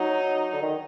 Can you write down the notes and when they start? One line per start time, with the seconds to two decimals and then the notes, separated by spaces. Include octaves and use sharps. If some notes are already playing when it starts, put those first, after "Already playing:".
Already playing: F#3 D#4
0.53 D3
0.62 D#3